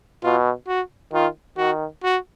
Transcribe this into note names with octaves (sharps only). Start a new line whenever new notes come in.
B2 F4
F#4
D#3 F4
D#3 F#4
F#4